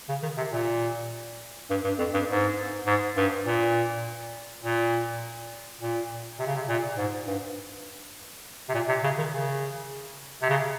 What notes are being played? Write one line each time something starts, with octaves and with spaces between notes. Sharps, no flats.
C#3
D#3
C3
A#2
G2
G2
F2
G2
G#2
G#2
G2
A#2
A#2
A#2
C3
C#3
C3
A#2
G#2
G2
C3
A#2
C3
C#3
D#3
C#3
C3
C#3